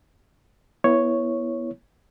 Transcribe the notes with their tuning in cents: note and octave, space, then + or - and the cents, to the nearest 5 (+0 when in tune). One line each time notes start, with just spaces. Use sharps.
B3 -20 E4 +0 C#5 +0